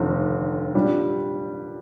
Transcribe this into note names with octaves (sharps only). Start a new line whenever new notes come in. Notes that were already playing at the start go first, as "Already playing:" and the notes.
Already playing: F1 D#2 D3
A#2 G3 D4 G4